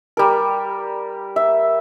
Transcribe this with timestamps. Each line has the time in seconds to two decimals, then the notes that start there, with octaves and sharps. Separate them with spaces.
0.17 G3 A#4
1.36 E5